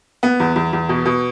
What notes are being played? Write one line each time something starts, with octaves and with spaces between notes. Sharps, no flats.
B3
E2
E2
E2
B2
B2